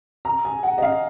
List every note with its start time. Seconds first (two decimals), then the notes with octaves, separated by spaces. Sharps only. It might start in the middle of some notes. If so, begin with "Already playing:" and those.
0.25 A#5
0.45 G#5
0.63 F#5
0.78 D#5
0.82 F5